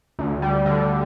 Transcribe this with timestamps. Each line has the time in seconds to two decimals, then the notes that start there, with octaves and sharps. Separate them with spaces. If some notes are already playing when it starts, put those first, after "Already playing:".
0.19 D2
0.42 G3
0.66 D3